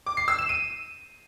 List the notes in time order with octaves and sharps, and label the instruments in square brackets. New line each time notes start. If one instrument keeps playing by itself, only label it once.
[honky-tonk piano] D6
C7
E6
E7
D#7